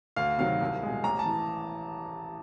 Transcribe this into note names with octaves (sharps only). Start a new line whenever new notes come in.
D2 F5
C3 D#3 F#3 F5
C2
B2 G#3
A1 A#5
A5
E3